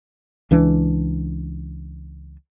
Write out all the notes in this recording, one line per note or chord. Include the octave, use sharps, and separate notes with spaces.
C#2 E3 D4